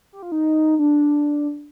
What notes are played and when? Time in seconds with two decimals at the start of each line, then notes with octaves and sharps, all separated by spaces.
0.13 G4
0.23 F4
0.32 D#4
0.79 D4